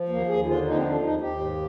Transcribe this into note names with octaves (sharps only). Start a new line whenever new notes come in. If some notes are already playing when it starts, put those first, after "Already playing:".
Already playing: F3
D#2 A#3
D#2 G#4
D3 F4
F3 D#4
C4
D#2 D4
D#2 D#4
D#2 G4
G#2